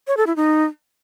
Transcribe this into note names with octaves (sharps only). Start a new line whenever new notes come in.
C#5
A4
E4
D#4